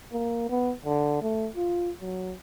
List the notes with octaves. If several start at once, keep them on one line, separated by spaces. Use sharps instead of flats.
A#3
B3
D3
A3
F4
F#3